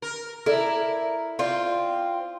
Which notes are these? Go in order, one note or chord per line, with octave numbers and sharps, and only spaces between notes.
A#4
E4 A4 A#4 D5
C4 F4 D5